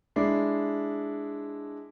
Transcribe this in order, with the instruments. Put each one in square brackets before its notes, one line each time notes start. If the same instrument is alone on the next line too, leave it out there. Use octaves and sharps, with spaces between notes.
[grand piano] G#3 D4 E4 C7